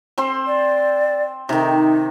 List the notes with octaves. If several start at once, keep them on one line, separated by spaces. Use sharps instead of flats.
C4 C5 C6
D5
C3 D#3 D#4